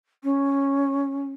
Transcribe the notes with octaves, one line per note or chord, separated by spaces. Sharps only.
C#4